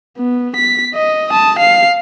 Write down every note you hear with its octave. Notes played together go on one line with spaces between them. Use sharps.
B3
B6
D#5
A5 D#6
F5 C7